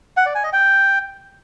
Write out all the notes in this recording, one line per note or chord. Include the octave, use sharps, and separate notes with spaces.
F#5
D5
G#5
D#5
G5